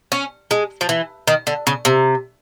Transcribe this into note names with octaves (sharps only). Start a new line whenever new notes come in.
C#4
G#3
F3
E3
D#3
D3
C#3
C3